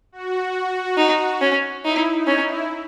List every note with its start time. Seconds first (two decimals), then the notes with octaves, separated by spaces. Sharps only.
0.12 F#4
0.97 D#4
1.41 C#4
1.85 D#4 E4
2.13 D#4
2.27 C#4
2.42 E4